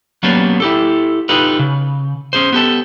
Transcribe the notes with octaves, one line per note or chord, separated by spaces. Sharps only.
F#3 A#3 B3 C#4 D4 G4
E4 G4 A4
D#4 F4 G4 A4 B4
C#3
C#4 G#4 C5
B3 G4 A4